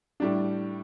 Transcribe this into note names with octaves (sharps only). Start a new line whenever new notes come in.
A2 G3 D4